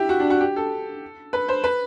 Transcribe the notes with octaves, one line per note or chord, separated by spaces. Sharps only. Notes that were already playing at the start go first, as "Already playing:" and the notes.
Already playing: E4 G4
F#4
D4
F#4
G4
A4
B4
C5
B4